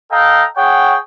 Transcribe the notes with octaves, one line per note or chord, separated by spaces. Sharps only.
A4 D#5 F5 G5 A#5
G#4 C#5 F#5 G5